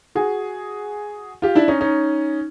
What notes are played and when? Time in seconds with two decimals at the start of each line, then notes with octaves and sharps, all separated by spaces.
0.15 F#4 G#4
1.42 F4 G4
1.55 D4 E4
1.68 C#4 D#4
1.81 C#4 D#4